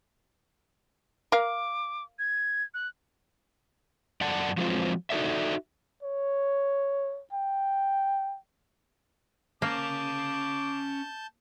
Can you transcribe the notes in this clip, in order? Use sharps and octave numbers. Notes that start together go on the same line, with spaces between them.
A#4 F5 D6
G#6
F#6
F#2 D5 F#5 A5
F3 F#3 G#3 C4 F4 C5
D#4 F#4 A4 D5 E5
C#5
G5
A#3 C#4 F5 A5 D6 G6